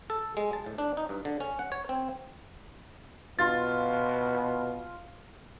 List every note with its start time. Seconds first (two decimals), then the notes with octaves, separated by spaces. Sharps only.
0.10 A4
0.37 G#3
0.53 A5
0.66 A2
0.78 D4
0.97 D#4
1.09 G2
1.25 D3
1.40 C#4
1.59 F#5
1.72 C#5
1.89 C4
3.39 B2 F4 C6 A6